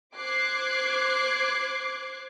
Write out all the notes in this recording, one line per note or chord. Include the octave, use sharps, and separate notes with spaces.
C5 D6 F#6 G#6 C7